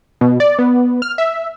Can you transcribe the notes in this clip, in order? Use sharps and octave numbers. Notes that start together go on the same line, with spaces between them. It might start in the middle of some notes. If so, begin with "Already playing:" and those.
B2
D5
B3
F6
E5